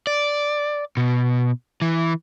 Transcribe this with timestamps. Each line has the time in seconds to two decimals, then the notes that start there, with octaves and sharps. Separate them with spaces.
0.07 D5
0.97 B2
1.82 E3